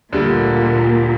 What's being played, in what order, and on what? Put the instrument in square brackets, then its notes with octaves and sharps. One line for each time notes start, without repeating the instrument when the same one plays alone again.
[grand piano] D2 D3 G3 [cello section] A#2